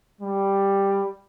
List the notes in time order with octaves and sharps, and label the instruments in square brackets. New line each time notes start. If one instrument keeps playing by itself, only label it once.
[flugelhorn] G3